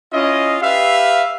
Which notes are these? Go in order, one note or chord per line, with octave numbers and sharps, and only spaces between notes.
C#4 E4 F4 D#5
G4 B4 E5 F5